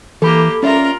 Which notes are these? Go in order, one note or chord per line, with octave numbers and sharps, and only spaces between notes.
E3 A#3 G4 A4 B5 D6
C#4 F4 A#4 D5 E5